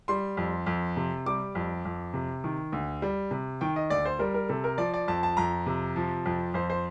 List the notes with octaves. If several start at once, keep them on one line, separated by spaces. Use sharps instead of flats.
G3 C6
F2
F2
C3
G3 D6
F2
F2
C3
D#3
D2
G3
C3
D#3 G5
D#5
D2 D5
C5
G3 A#4
A#4
C3 A4
A#4
F3 D5
D5
F2 A5
A5
F2 A#5
C3
F3
F2
F2 C5
C5